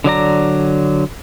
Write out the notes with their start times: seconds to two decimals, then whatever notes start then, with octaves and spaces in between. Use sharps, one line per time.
0.04 D3 F#3 D5 A#5